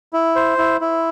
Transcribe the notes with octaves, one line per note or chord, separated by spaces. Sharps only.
E4
C5
E4
E4